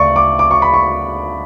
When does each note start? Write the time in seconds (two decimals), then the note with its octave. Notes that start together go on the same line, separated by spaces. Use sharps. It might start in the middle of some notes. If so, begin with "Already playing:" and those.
Already playing: D2 C#3 D5 C#6
0.16 D6
0.39 D6
0.51 C#6
0.62 B5
0.73 C#6